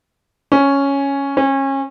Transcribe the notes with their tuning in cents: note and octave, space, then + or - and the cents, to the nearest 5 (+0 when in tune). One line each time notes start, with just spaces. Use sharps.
C#4 +0
C#4 -30